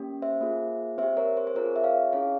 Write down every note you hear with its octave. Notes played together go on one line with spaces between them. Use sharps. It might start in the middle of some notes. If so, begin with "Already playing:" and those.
Already playing: A#3 C#4 G4
C5 E5
A#3 F4 G#4
C4 G4 C5 E5
A#4 C#5
C5
C5
C4 F4 G#4 A#4 C#5
E5
C#5 F5
C#4 E4 G#4 C#5 F5